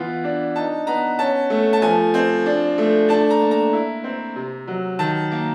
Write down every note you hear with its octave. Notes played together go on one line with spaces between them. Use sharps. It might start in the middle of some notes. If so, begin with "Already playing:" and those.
Already playing: E3 B3 F4
D4
D#4 A5
B3 A#5
C#4 A5
A3
A5
F3 G#5
C4
D4
A3
D4 A5
A#5
A#3
A#5
E4
C4
C3
F#3
D#3 A5
A#3